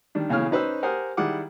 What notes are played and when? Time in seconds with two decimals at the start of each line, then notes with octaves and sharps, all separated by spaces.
0.15 D#3 G3 D4
0.29 B1 C#3 E3 C#5 F6
0.51 C#4 D#4 B4 C5 E6
0.83 G4 A#4 C5 F#5 G#5 D#6
1.17 D#3 G3 E4 G#4 F#5 D6